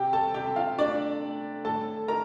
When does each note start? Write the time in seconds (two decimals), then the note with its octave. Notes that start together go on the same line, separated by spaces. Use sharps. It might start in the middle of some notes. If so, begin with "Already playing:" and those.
Already playing: C3 G4 G5
0.13 A4 A5
0.34 C3 G4 G5
0.56 F4 F5
0.78 A3 D4 D5
1.22 A3
1.65 A2 A4 A5
2.08 D#4 A#4 A#5